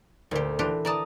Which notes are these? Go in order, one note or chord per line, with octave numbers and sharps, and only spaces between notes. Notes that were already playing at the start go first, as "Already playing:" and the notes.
D2 A#2 G4
E3 D4 F4 G4
E3 D5 A5 A#5 D#6